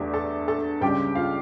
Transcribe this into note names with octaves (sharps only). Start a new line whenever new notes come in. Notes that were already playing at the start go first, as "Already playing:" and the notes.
Already playing: E2 D3 A3 G4 E5
A4 A5
A4 A5
C#2 C#3 G3 G4 G5
F4 F5